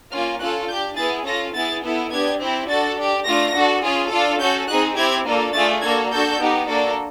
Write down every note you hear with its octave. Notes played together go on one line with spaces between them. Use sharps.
A#3 C#4 F4 F6
C#4 F4 A4 F#6
D4 G4 G6
B3 E4 G#4 A6
C#4 F4 A4 A#6
B3 E4 G#4 A6
B3 E4 A4
B3 D4 G4 G#6
C4 E4 G4
D4 F#4 A4 A6
D4 G4
A3 D4 F4 A#6
D4 F#4 A4
C#4 F4 G#4
D4 F4 A4
C#4 F#4 A4 G6
C4 D#4 G#4 F#6
C4 E4 G4 G#6
A#3 D4 F4 A4
A3 D4 F4 G#4 A6
A#3 D4 F#4 A4 G#6
D4 F#4 A4 G6
B3 D#4 G4
A#3 D4 F#4 A4